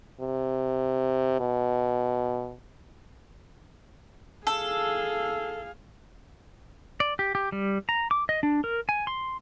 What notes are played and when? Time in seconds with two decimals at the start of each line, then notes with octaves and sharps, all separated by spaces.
0.21 C3
1.40 B2
4.47 G#4 A4 F5
7.00 D5
7.19 G4
7.35 G4
7.52 G3
7.89 A#5
8.11 D6
8.29 D#5
8.43 D4
8.64 A#4
8.89 G#5
9.07 C6